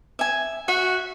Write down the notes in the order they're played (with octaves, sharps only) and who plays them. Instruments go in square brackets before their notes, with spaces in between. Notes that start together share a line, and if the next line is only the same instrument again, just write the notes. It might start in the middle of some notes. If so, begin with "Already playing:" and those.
[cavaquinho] E5 G#5
[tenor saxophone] F#4 [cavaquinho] E5 [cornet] F#5